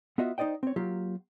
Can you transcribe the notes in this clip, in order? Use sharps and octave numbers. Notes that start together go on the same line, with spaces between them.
B3 F4 F#4 D#5 E5
D#4 C5 D5 D#5 G5
C4 C#5
F#3 A#3 F4 G4